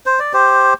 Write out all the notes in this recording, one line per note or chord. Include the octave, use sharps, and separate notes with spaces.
C5
D5
G4 C5